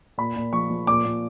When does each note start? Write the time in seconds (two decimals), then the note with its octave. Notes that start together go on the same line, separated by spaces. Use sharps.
0.18 A#2 B5
0.36 A#2
0.53 F3 C#6
0.70 F3
0.87 A#2 D6
1.04 A#2